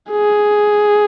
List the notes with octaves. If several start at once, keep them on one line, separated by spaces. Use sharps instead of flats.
G#4